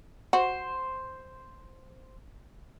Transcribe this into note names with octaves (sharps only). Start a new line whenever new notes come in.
F#4 C5